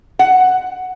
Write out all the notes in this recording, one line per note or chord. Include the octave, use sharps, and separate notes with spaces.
F#5